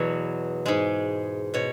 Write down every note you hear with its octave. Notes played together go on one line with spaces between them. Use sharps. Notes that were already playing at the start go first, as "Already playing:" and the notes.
Already playing: E2 B2 F#3 C#5
G#2 G#3
B2 C#5